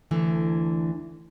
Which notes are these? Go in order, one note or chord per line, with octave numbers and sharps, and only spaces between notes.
D2 D3 E3